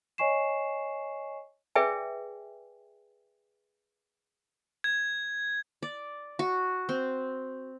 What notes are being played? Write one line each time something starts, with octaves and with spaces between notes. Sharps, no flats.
C#5 D#5 G#5 C#6 C7 E7
G#4 B4 D5 E5 G5 G#5
G#6
D5
F#4
C4